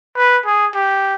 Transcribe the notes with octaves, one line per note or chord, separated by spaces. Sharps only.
B4
G#4
G4